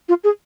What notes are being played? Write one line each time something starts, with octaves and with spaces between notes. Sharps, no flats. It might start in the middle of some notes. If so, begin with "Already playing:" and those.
F4
G#4